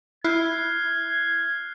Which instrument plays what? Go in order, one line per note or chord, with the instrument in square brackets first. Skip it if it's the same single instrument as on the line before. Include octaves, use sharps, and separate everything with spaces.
[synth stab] E4 [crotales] F6 F#6 C7 [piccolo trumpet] G#6